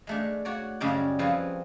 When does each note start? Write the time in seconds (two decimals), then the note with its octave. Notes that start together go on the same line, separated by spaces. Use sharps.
0.07 G#3 A3 D4
0.45 F#4 C#5 D5
0.80 F#2 C#3 G3 G#3 D5 G5
1.19 F3 C4 G#4 B4 C#5 G#5